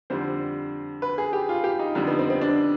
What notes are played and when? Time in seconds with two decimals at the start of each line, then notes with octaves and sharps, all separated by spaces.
0.10 F2 D3 G3 C5
1.02 B4
1.18 G#4
1.33 G4
1.49 F4
1.64 G4
1.79 D#4
1.95 F2 D3 G3 D#4
2.07 B3
2.19 C4
2.30 C4
2.41 D4